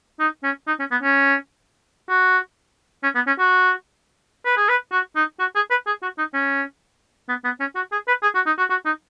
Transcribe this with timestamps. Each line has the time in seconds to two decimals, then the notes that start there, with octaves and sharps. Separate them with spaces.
0.20 D#4
0.43 C#4
0.67 D#4
0.79 C#4
0.91 B3
1.03 C#4
2.09 F#4
3.03 C#4
3.15 B3
3.27 C#4
3.39 F#4
4.45 B4
4.57 G#4
4.69 B4
4.92 F#4
5.16 D#4
5.40 F#4
5.55 G#4
5.71 B4
5.87 G#4
6.02 F#4
6.18 D#4
6.34 C#4
7.28 B3
7.44 B3
7.60 C#4
7.75 F#4
7.92 G#4
8.08 B4
8.23 G#4
8.35 F#4
8.46 D#4
8.58 F#4
8.70 F#4
8.86 D#4